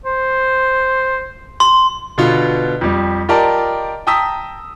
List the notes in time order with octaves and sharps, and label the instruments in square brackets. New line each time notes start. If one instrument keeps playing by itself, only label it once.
[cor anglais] C5
[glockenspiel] C6
[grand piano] B2 D3 B3 F4
F2 G3
F4 G4 A#4 D5 D#5 A5
G5 A5 A#5 D#6 E6 B6